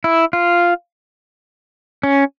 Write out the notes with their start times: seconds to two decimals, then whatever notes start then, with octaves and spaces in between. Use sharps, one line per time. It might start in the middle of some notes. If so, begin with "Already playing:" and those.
0.04 E4
0.33 F4
2.03 C#4